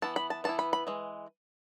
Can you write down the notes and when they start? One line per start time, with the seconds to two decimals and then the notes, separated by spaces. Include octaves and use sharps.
0.02 E3 B3 E4 A5
0.16 B5
0.30 A5
0.44 E3 B3 E4 A5
0.59 B5
0.73 B5
0.87 E3 G#3